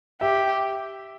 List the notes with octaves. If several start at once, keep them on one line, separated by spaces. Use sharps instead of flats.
G4 E5